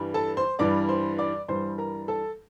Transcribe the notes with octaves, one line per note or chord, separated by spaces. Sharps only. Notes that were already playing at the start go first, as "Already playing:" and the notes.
Already playing: G2 E3 G3
A4 A5
C5 C6
G2 E3 G3 D5 D6
C5 C6
D5 D6
G2 E3 G3 C5 C6
A#4 A#5
A4 A5